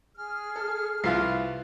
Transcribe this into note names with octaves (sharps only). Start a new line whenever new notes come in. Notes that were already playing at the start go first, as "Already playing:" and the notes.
G#4 F6
A4
C2 E4 F4 B4 F5 C7